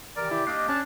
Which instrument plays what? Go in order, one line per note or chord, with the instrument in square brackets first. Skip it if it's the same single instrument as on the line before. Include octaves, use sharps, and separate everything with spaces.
[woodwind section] C3 D#3 E3 [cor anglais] A#4 [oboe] D5
[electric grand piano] E4 [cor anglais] G4
[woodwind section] A#3 D#5 [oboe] D4 [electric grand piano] D6 F6 C7
[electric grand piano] C#4 [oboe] D4 [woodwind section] C#5 D5 A5